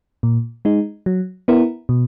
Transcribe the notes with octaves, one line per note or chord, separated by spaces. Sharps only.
A#2
G#3 D#4
F#3
B3 E4 A#4
B2